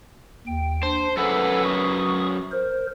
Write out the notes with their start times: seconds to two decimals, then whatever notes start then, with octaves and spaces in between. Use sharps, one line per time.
0.47 D#2 G5
0.83 D4 C5
1.17 F#2 G#4 A4 B4 F#5 E6
1.64 C#6 D#6
2.52 A#4 C5